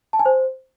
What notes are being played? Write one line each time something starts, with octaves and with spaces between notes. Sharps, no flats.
A5
G#5
C5